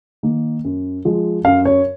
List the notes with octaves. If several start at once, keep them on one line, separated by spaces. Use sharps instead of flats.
D#3 A#3
F#2
F3 G#3
F#2 F5
C#5